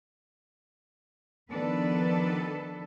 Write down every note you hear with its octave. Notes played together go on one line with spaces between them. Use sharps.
D#3 F3 B3 D4 A4 B4